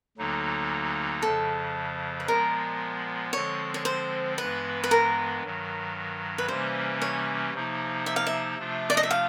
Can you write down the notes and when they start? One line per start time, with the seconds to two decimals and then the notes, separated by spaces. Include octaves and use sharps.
0.18 D2 D3 F#3 A#3 D#4
1.22 F2 C#3 F3 A4
2.20 B4
2.28 A#2 F3 G#3 B3 A#4
3.33 D3 F3 G#3 C4 C#5
3.74 C#5
3.85 C5
4.38 G2 E3 G#3 B3 B4
4.84 B4
4.91 A#4
5.44 G2 D#3 F#3
6.38 B4
6.48 C3 E3 G3 A#3 C#4 C5
7.02 C#5
7.53 C3 F3 A#3 D#4
8.06 E5
8.16 F5
8.27 E5
8.59 C3 F3 A3 D4 F4
8.90 D5
8.97 D#5
9.03 E5
9.11 F5